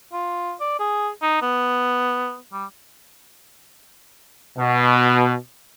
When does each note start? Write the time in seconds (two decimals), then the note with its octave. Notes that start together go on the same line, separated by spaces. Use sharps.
0.13 F4
0.60 D5
0.80 G#4
1.22 D#4
1.42 B3
2.52 G3
4.58 B2